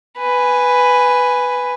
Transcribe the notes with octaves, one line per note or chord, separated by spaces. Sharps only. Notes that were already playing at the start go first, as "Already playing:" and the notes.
B4 G#5